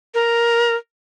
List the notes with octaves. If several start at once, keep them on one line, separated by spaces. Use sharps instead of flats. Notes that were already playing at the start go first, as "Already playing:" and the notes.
A#4